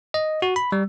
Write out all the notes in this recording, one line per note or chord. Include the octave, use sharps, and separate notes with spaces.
D#5
F#4
B5
G3